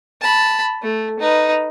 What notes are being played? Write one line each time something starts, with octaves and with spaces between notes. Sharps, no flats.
A5 B5
A3
D#4 B4